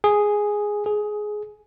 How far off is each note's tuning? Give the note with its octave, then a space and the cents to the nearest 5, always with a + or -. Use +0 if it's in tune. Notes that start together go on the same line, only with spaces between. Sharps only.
G#4 +0
G#4 +15